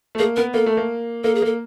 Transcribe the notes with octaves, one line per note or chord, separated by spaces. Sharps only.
A3
A#3 G#4
B3 A#4
A#3 A4
A3
A#3
A#3 A4
G#4
A#3 A4